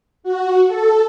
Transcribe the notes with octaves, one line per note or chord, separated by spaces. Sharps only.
F#4
A4